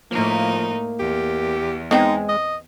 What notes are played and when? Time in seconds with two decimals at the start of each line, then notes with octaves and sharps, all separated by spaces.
0.11 A2 F3 A#3 D#4
0.99 E2 G4
1.91 G#3 B3 C4 D#4 G5
2.29 D#5